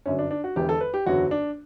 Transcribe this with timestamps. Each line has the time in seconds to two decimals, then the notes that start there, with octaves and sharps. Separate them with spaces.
0.06 G1 F#2 D3 F#3 C#4
0.19 D4
0.31 D4
0.44 F#4
0.56 E1 E2 D3 G4
0.69 A4
0.81 B4
0.94 G4
1.06 F#1 E2 D3 F#3 F#4
1.31 D4